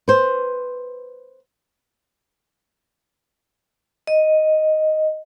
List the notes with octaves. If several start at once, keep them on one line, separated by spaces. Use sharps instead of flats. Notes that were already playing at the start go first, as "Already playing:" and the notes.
B4 C5
D#5